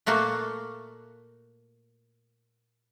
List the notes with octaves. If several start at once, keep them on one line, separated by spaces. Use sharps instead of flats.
A#2 A3 A#3 F#4 A5